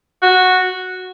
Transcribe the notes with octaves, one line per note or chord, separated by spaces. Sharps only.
F#4